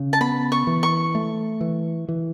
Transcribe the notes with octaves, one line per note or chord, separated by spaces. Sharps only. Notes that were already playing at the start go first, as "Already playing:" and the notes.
Already playing: C#3
A5
B3 B5
C#6
E3
C#6
A3
E3
E3